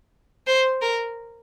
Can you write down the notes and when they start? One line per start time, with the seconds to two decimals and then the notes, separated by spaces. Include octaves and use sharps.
0.47 C5
0.82 A#4